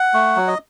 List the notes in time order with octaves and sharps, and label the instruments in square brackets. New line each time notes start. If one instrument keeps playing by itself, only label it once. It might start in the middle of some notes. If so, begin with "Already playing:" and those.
Already playing: [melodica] F#5
A3
F#3
D#5